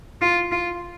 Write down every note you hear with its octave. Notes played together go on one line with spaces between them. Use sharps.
F4
F4